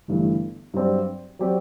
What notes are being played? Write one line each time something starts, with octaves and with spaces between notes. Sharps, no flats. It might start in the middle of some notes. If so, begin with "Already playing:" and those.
G1 G2 E3 A3
G2 F#3 C4 G4 D5
F#3 C4 G4 D5